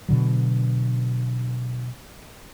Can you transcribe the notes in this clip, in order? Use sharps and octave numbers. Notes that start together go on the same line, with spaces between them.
B2 D3 F#3